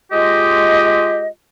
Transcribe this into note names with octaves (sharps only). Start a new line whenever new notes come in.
G#3 F4 G4 D#5